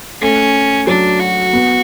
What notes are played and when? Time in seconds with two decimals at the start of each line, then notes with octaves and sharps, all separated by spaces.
0.21 A3 C#4
0.87 F#3 D4
1.20 F#4
1.53 B3